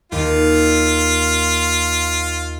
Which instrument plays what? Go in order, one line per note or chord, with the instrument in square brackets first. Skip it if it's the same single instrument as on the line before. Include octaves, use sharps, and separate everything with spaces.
[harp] D#2 [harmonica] F4